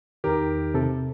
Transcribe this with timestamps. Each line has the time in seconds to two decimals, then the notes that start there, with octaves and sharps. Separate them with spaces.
0.24 E2 D#3 G4 A#4
0.74 C3 A4